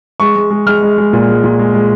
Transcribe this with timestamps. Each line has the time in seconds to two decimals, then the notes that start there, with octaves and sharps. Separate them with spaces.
0.20 G#3 C#6
0.36 G#3
0.50 G#3
0.67 G#3 F6
0.82 G#3
0.98 G#3
1.13 A#2
1.28 G#3
1.44 A#2
1.59 G#3
1.74 G#3